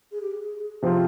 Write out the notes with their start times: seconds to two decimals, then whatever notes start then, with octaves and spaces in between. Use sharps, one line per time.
0.12 G#4
0.21 G4
0.31 G#4
0.82 C3 F3 C4 F4 G#4